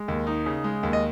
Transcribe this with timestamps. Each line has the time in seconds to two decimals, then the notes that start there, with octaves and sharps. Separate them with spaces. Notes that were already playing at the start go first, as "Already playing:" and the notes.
Already playing: G#3
0.08 D#2
0.27 D#4
0.46 C#3
0.64 G#3
0.83 D#2
0.93 D#5